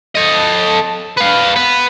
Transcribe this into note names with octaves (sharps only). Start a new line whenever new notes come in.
A4 D#5
B4 F5
B3